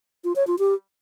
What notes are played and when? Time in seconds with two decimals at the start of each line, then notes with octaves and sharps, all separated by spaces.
0.24 F4
0.36 C#5
0.47 F4
0.59 G4